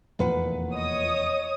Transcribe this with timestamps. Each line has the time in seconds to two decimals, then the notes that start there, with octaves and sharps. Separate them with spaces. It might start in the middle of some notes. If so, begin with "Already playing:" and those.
0.19 F1 E2 A#2 B4 F#5
0.74 C#5 D#5 D#6